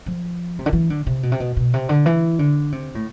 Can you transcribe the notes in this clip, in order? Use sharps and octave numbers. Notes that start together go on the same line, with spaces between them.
F3
C3
D3
E3
D3
C3
B2
C3
B2
B2
C3
D3
E3
D3
C3
A2